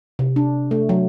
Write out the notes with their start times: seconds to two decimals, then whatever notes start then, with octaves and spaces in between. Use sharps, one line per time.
0.19 C3
0.36 D4
0.71 A3
0.89 F#3